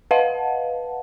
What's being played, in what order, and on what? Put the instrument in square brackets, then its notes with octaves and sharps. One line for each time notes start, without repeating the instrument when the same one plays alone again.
[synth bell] B4 D#5 F5 F#5 A5